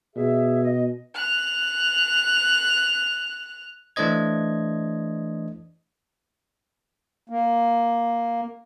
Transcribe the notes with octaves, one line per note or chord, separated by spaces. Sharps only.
B2 G#4 E5
D#5
F#6 F7
E3 A3 D4 C5 D#5 G#6
A#3